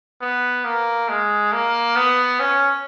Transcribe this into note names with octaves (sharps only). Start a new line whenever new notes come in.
B3
A#3
G#3
A#3
B3
C#4